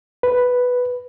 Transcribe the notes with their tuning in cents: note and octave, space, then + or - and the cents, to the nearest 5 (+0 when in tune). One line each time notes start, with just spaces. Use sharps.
B4 +0